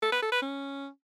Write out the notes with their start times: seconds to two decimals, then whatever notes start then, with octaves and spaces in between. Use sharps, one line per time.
0.02 A4
0.12 B4
0.22 A4
0.32 B4
0.42 C#4